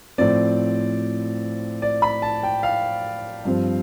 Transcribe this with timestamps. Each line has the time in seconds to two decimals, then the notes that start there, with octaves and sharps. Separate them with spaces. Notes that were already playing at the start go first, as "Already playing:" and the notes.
0.18 A2 F3 C4 D5
1.82 D5
2.02 B5
2.22 A5
2.43 G5
2.63 F5
3.45 G2 F3 C4